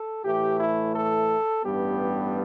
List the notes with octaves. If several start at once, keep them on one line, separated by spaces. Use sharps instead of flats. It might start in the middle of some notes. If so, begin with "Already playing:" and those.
Already playing: A4
A2 E3 A3 G4
E4
A4
A1 G2 G3 B3 G4